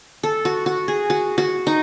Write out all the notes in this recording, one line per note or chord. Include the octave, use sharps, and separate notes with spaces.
A4
F#4
F#4
G#4
F#4
F#4
D#4